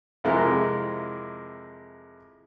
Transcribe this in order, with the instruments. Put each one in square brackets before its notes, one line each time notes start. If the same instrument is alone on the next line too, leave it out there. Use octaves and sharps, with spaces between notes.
[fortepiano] F2 C3 G#3 E4 A#4 F6